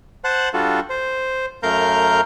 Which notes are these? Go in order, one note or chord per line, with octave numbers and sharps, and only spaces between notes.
C5 F#5 A5 F#6
G3 D4 F4 F#4 A4
C5
F#2 A3 A#4 F5 A#5 G6